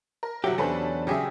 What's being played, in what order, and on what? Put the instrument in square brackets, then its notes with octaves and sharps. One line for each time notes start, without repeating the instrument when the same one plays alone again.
[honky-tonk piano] A#4
[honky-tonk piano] G1 E5 [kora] C3 F#3 [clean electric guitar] F#4 G4
[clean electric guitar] E2 D4 [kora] C#4 [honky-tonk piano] A4 B4 C5
[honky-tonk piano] C#3 E5 [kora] F#3 G4 G#4